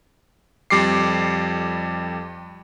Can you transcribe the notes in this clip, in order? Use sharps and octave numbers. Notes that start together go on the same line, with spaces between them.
F2 G3 D6 C7